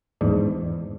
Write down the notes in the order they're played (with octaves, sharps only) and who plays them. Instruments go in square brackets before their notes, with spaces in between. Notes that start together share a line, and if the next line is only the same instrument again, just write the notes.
[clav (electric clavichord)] E2 G#2 D4